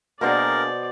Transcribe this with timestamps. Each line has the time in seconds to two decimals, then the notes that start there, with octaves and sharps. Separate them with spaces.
0.21 B2 A#3 D4 G#4 A#4 C5 D5 F#5